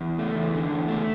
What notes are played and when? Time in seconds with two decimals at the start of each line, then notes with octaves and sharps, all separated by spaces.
0.01 E2
0.19 A3
0.36 E2
0.54 D3
0.72 E2
0.88 A3